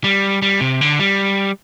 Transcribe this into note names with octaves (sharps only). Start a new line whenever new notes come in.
G3
G3
C3
D3
G3